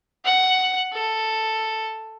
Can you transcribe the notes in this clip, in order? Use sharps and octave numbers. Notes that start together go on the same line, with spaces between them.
F#5
A4